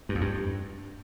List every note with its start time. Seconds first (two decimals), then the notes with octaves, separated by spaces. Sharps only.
0.09 G2
0.15 F2
0.21 G2